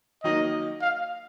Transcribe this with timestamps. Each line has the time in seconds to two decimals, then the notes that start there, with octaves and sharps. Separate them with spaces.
0.24 D#3 F#3 A#3 D#4 D#5
0.81 F5